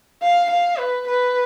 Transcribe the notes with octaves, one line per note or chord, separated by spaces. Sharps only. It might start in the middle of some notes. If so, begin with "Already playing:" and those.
F5
F5
B4
B4